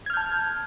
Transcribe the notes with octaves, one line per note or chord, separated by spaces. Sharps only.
A5 F6 G6 G#6